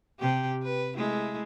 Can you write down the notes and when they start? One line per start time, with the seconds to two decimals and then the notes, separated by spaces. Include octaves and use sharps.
0.20 C3 G4
0.63 B4
0.97 G#3 A3 E4